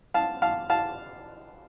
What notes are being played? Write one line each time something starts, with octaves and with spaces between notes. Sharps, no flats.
F5 A5
F5 A5
F5 A5